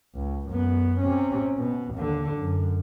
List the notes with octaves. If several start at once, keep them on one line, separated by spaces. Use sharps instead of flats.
C#2
F#2 B3
C3 C#4
B2
D#2 D3
F#2